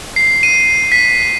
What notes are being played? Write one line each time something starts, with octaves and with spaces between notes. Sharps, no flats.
C7
D#7
B6